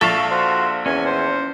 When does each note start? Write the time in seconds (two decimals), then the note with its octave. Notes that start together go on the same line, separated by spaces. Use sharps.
0.01 A#1 A4 E5 F5 C#6 A6
0.31 F#4 C5
0.86 E2 C#4 G#5
1.06 C5